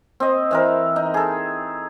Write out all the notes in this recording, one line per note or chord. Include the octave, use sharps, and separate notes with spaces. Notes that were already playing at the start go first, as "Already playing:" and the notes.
C4 D#5
E3 C4 A#4
D#4
G#4 A4